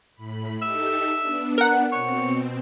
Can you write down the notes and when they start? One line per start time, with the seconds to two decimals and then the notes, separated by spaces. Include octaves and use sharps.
0.15 A2 B5
0.62 D#4 G4 A4 E5
1.19 B3 D4
1.58 A#4 F#5
1.92 B2 C4 C#5